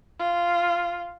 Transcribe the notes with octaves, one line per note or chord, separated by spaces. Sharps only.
F4